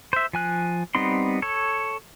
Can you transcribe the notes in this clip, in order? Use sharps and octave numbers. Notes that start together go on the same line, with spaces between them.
C5 E5
F3 G#5 F#6
G3 B3 C4 D#4 C6
A4 C#5